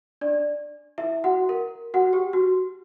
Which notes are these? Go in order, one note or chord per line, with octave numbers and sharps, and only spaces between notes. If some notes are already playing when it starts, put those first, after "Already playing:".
D4 D5
E4 E5
F#4 F#5
A#4
F#4 F#5
G4
F#4